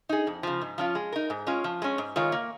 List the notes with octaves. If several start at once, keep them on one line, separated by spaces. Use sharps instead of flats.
D#4 G#4
F2
C#3 F3
G#2
F3 C#4 F4
G#3
D#4 A#4
G#2
G#3 C#4 F4
F3
G#3 C#4
G#2
D#3 G#3 F4 C#5
A#3